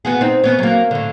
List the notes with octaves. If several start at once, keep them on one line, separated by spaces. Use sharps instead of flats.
B3 F#4 G#4
C4 D#4
B3 C#4
F#3 A#3
A2 D3